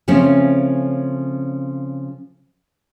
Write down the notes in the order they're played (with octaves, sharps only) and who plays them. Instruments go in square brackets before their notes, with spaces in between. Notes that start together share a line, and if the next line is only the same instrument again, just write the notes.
[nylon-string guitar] C#3 F3 A3 C4 C#4